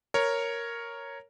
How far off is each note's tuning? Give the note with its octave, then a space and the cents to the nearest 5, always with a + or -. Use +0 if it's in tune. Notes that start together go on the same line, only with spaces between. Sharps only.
A#4 +0 C#5 +0